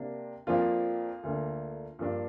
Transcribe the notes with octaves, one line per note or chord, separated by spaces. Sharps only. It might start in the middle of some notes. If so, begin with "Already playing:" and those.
Already playing: C3 A#3 D4
F2 F3 A#3 D4 F4
D2 D3 A#3 D4
G2 F3 A#3 D4